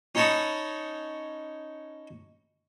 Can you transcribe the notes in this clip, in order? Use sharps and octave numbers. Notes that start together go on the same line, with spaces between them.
C#4 D#4 C#5 A5 B5 D#6